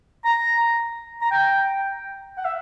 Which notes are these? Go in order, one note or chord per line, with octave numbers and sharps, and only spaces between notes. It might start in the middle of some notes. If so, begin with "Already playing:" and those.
A#5
A#5
G5
F#5
E5